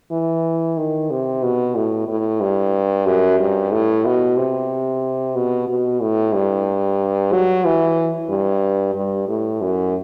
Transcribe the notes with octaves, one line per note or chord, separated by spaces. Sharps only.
E3
D#3
C3
B2
A2
A2
G2
F#2
G2
A2
B2
C3
B2
B2
A2
G2
F#3
E3
G2
G2
A2
F#2